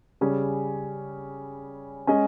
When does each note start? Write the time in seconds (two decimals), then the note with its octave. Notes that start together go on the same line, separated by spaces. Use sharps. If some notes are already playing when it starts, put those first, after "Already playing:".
0.21 C#3 G3 C#4 G#4
2.07 G#3 C#4 G#4 D#5